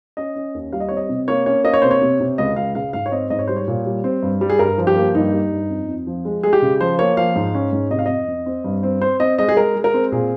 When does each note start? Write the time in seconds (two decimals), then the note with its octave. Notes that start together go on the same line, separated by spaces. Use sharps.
0.17 C#4 D#5
0.36 C#4
0.54 D#2
0.73 G3 F5
0.80 D#5
0.89 C4 C#5
0.97 D#5
1.09 C3
1.28 A#3 C#5
1.46 C#4 C#5
1.64 A#3 D#5
1.73 C#5
1.82 C3 C5
1.91 C#5
2.01 C3
2.20 C3
2.38 C#2 D#5
2.56 C#2 F5
2.75 C#3 F5
2.93 G#2 F5
3.06 C#5
3.12 C4 D#5
3.30 G#2 D#5
3.39 C#5
3.47 G3 C5
3.56 C#5
3.68 A#2
3.86 G3
4.04 C4
4.23 G2
4.41 G3
4.50 G#4
4.59 G2 A#4
4.78 F3
4.87 G4
4.96 A#3
5.15 G2 D#4
5.33 G3
5.52 G2
5.70 F2
5.89 F2
6.07 F3
6.25 G#3
6.43 G#3 G#4
6.53 G4
6.62 C#3
6.80 F3 C5
6.99 A#3 C#5
7.17 F3 F5
7.36 G#2
7.55 C#4
7.73 G#2
7.91 C3 D#5
7.99 F5
8.06 F2 D#5
8.28 F2
8.46 C4
8.64 G2
8.83 C4
9.01 C4 C5
9.20 C4 D#5
9.38 G#3 D#5
9.49 G#4
9.57 G#3 A#4
9.75 G#3
9.84 A#4
9.94 C4
10.12 A#2 G#4